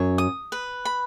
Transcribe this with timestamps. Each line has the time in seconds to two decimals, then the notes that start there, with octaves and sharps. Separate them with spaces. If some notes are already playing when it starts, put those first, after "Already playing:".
Already playing: F#2 C#5
0.18 D#6
0.52 B4
0.85 B5